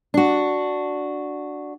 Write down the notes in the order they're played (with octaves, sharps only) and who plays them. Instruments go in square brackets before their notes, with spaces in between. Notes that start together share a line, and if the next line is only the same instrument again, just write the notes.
[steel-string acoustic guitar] D4 F#4